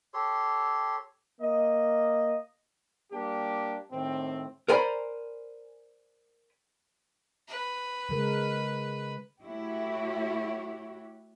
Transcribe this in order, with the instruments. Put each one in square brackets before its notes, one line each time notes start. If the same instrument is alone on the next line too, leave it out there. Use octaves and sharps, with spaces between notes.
[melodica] G4 A4 C#5 C6
[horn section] A#3 D#5
[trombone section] G3 A#3 D4 G4
A2 D#3 C4
[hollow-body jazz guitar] A#4 C5 D5 G#5 A#5 B5
[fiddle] B4
[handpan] C#3 G#3 A#4
[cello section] A3 E4 F#4 G4 C#5